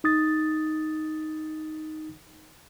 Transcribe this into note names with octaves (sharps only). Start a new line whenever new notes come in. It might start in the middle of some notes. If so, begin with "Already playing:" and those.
D#4 D#6 A6